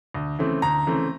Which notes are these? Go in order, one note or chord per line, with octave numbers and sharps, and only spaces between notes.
D2
C#3 E3 A3 C4
D2 A#5
C#3 E3 A3 C4